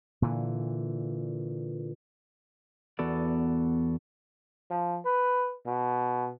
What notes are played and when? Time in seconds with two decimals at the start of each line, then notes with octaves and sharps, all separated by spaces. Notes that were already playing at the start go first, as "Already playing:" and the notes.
0.22 A#2 D3 E3
2.99 E2 B3 F#4 A4 D5
4.70 F3
5.05 B4
5.66 B2